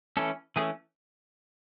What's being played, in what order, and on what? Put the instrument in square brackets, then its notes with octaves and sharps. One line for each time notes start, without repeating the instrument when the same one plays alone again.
[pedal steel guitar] E3 A3 C#4 A4
E3 A3 C#4 G#4